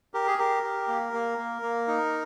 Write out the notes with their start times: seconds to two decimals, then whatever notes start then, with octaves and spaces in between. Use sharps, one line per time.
0.14 G4 A#4
0.27 G#4
0.38 G4 A#4
0.63 G4
0.88 A#3
1.13 A#3
1.38 A#3
1.62 A#3
1.88 D#4